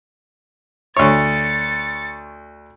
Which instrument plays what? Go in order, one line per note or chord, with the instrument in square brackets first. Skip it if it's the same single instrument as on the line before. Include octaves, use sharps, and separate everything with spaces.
[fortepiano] D2 C#5 [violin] A6 C#7